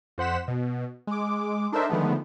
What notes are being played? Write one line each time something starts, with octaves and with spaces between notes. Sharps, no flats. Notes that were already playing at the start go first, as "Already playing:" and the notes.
F2 C5 F#5 B6 E7
B2
G#3 D6
D4 D#4 A4 A#4 C5 E5
D3 D#3 F3 G#3 A3 B3